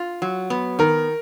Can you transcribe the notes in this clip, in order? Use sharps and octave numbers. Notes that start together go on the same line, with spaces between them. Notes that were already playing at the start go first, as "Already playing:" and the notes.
Already playing: F4
F#3
B3
D#3 A#4